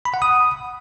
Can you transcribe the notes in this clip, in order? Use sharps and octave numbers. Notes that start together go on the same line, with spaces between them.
B5
F#5
D#6